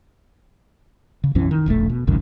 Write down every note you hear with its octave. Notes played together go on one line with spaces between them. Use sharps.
C#3
B1 F#2 E3 C#4
D#3
E1 A#1 C3 A3
B2
G#1 C#2 F#2 D#3